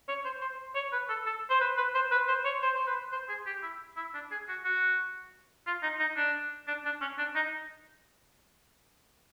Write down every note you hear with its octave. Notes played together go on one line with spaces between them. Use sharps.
C#5
C5
C5
C#5
B4
A4
A4
C5
B4
B4
C5
B4
C5
C#5
C5
C5
B4
C5
G#4
G4
E4
E4
D4
G#4
F#4
F#4
F4
D#4
D#4
D4
D4
D4
C#4
D4
D#4